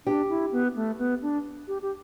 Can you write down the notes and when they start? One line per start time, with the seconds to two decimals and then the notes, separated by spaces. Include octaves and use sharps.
0.06 D4 G4
0.29 E4
0.52 B3
0.75 A3
0.98 B3
1.22 D4
1.68 G4
1.82 G4